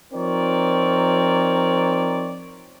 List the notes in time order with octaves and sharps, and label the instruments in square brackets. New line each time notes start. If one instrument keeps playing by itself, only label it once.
[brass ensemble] F3 C4 D#4 A#4 C#5 D5